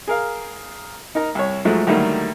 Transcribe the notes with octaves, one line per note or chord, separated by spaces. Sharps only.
G#4 A#4 F5
D#4 A#4 A#5
C2 C#5
G#2 F3 F#3 G#3 A3
D3 D#3 F#3 G3 A3 A#3